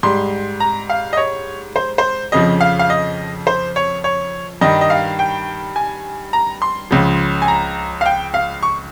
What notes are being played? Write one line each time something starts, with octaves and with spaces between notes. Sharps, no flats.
G#2 G3 C6
A#5
F5
D#5
C#5
C5
C5
F2 C#3 F3 D#5
F5
F5
D#5
C5
C#5
C#5
G2 D#3 G3 D#5
D#5
F5
G5
G#5
A#5
C6
C#2 C#3 F3
G#5
A#5
F5
G5
F5
C#6